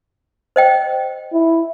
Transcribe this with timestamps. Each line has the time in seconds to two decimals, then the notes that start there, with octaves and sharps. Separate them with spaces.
0.56 C5 D#5 G5
1.33 E4